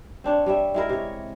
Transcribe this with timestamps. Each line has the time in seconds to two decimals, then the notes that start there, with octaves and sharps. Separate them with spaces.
0.24 C4 D4 C#5
0.46 G3 C#5 E5
0.74 G#3 E4 A#4
0.89 C3 C#5